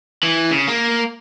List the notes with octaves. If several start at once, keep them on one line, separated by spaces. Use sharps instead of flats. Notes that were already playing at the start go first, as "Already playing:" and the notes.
E3
C#3
A#3